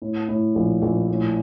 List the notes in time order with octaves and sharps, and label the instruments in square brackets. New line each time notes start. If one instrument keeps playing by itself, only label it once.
[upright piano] A2
A2
A#1
A#1
A2